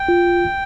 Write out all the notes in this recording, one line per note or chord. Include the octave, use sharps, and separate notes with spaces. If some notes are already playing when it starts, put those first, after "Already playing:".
Already playing: G5
F4